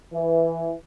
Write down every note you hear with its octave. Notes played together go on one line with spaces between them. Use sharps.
E3